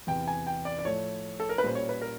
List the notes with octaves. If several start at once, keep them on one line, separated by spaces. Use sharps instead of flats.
E2 C3 E3 G5
G#5
G5
D5
D5
A2 F3 A3 C#5
A4
A#4
B4
A#2 G3 A#3 C#4 C5
C#5
B4
A#4